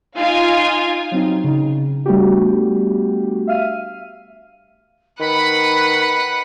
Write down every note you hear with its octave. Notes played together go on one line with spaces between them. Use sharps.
D#4 F4 F5 G#5
F#3 C4 D#4
C#3 D#4
G3 A3 B3 D4 F#4 G4
E5 F5 F6 D#7
D#3 B4 F#5 B5